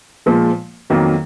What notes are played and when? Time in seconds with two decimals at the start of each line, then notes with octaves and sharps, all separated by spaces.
0.26 A#2 F3 G#3
0.90 F2 D#3 F#3 A#3